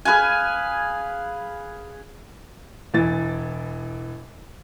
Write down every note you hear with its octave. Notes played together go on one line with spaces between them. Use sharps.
G#4 B4 F5 G#5
E1 E3 A6